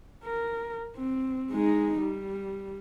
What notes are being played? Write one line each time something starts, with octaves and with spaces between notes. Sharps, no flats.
A#4
C4
G#3 D#4
G3